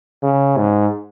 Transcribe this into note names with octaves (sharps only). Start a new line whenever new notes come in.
C#3
G#2